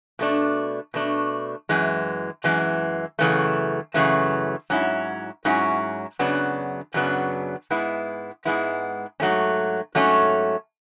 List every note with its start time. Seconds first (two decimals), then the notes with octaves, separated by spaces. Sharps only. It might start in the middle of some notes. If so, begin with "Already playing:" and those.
0.19 B2 A3 D4
0.94 B2 A3 D4
1.69 F#2 E3 G#3
2.44 F#2 E3 G#3
3.19 F#2 C#3 E3 A3
3.94 F#2 C#3 E3 A3
4.70 G#2 F#3 C#4 E4
5.45 G#2 F#3 C#4 E4
6.19 F#2 C#3 F#3 B3 D4
6.94 F#2 C#3 F#3 B3 D4
7.70 G#2 G#3 B3 E4
8.45 G#2 G#3 B3 E4
9.20 G#2 F#3 A3 C#4
9.95 G#2 F#3 A3 C#4